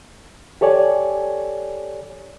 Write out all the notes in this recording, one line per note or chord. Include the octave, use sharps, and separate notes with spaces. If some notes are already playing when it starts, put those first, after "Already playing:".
G4 A4 C#5 D5 G#5